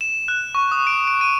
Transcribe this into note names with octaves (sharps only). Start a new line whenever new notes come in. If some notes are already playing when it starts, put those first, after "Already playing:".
E7
F#6
C#6
D#6
D7
D7
D#7